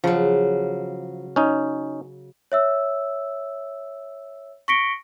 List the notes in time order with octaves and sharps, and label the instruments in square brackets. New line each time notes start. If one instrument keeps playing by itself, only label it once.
[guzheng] C#3 F#3 [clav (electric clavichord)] F3
[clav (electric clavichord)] C#4 D#4
[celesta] C#5 E5 E6
C#6 A#6 B6 C#7 D7 G7